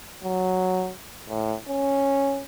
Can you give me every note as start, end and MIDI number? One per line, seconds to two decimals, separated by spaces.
0.24 0.91 54
1.29 1.55 45
1.68 2.42 61